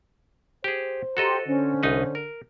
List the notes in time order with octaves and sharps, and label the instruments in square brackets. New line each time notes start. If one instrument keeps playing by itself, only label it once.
[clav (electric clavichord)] G4 G#4 [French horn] C5
[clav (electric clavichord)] F#4 A4 D#5 [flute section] G4 A#5 C6
[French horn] D3 [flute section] C#4 C5
[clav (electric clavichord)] C2 D#4 B4
A#4